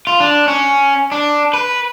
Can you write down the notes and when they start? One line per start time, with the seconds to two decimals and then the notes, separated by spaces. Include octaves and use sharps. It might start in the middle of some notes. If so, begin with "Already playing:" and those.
0.07 F4
0.20 D4
0.48 C#4
1.12 D4
1.54 B4